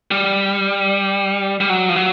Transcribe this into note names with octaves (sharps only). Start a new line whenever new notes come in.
G3
G3
F#3
F3
F#3